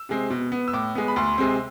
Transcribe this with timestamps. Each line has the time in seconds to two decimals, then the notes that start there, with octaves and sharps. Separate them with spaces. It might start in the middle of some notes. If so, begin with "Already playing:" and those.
Already playing: E6
0.09 C3 G#3 C4
0.30 B2
0.52 B3
0.68 E6
0.73 A2 D6
0.95 G#3 B3
1.08 B5
1.16 D2 C6
1.38 C3 G#3 C4